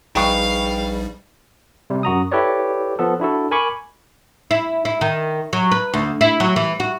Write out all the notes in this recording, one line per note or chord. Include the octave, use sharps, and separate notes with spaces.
A#1 G3 D#4 G#4 B4 F5 G5 C#6
C3 G3
F#2 F#4 A#5 D#6
E4 G4 A4 B4 C#5 D5
F3 B3 A4
D4 E4 F#4 A4
A#4 G#5 B5 C#6 D6
E4
E4
D#3
F#3
B4
D2
E4
F#3
E3
F#4